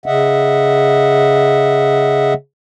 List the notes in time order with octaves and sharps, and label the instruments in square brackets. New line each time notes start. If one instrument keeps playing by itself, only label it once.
[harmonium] C#3 D#5 E5 F#5